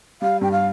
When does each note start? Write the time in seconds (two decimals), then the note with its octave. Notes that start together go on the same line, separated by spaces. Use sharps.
0.22 G3 F5
0.41 G2 G5
0.52 F5